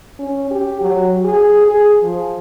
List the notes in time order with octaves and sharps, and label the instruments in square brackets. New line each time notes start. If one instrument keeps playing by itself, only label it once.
[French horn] C#4
G4
F#3
G#4
G#4
F3